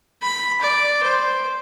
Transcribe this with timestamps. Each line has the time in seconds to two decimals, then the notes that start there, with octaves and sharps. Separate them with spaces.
0.22 B5
0.61 D5
1.03 C5